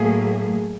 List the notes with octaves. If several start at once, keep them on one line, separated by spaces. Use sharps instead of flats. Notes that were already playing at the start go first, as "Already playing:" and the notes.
Already playing: A2 F#3 A#3 G#4